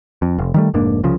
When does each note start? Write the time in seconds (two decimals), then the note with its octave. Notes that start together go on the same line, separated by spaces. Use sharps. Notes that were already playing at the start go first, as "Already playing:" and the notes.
0.22 F2
0.38 F1
0.54 D#3 G3 A3
0.74 F1 G#2 A#3 D4
1.04 C2 C#3 F3